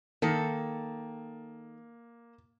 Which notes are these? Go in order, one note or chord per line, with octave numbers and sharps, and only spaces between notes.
D#3 A#3 A4